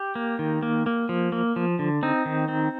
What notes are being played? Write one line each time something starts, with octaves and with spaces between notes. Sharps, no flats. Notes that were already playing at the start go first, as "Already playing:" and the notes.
Already playing: G4
A#3
D#3
A#3
A#3
F3
A#3
F3
D3
C4 D#4
D#3
C4